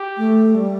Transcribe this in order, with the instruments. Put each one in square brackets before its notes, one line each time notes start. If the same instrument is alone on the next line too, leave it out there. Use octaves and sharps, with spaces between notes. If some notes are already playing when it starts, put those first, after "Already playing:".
Already playing: [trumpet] G4
[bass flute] A3
G3